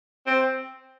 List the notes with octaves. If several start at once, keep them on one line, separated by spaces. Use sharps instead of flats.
C4